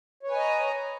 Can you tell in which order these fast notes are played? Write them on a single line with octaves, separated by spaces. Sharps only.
C#5 B4 G#5 D#5 A#5